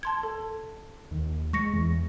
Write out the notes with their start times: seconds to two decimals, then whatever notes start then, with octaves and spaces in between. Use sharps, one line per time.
0.03 A5 C6 G#6
0.23 A4
1.11 D#2
1.53 G#3 C#6 A#6 C#7
1.73 E2